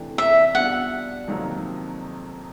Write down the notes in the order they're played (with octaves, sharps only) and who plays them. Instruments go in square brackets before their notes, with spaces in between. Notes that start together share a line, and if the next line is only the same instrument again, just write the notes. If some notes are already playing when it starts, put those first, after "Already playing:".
Already playing: [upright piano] C3 E3 A3 D4 G4
[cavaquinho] E5
[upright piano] B2 G3 B3 D4 F4 [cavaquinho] F#5
[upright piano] F2 C3 D#3 F#3 A#3